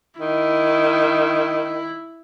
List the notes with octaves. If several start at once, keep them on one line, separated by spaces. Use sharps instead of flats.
D#3 E4